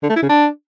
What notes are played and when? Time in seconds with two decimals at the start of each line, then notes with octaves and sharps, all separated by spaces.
0.03 D3
0.09 A3
0.16 E4
0.22 C#3
0.29 D4